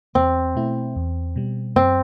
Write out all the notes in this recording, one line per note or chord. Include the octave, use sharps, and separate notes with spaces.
E2 C4
B2 A3 E4
E2
B2 G3
F#2 C4